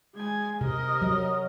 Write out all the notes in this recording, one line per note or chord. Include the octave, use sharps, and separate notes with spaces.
G#3 G#5
C3 A#4 D#5
F#3